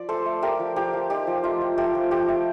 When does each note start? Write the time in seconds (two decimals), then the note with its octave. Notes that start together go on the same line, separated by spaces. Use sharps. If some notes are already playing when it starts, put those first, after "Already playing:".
Already playing: F3 D5
0.09 A3 A4 C5
0.26 A3
0.42 A3 G4 A#4
0.59 F3
0.76 F3 G4
0.93 F3
1.10 D#4 G4
1.27 F3
1.44 A3 F4
1.61 F3
1.77 A3 G4
1.95 F3
2.11 A3 G4
2.29 A3